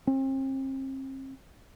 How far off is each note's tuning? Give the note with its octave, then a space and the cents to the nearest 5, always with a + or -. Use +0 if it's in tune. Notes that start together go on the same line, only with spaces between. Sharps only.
C4 +40